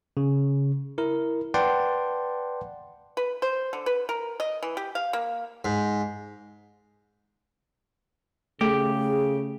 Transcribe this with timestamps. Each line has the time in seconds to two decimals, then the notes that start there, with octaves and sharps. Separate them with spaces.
0.17 C#3
0.98 E4 A#4
1.54 B4 D5 F#5 G5 A5 C6
3.17 B4
3.42 C5
3.73 D3
3.86 B4
4.09 A#4
4.40 D#5
4.63 E3
4.77 G4
4.95 F5
5.13 A#3
5.65 G#2
8.61 C#3 A3 G4 G#4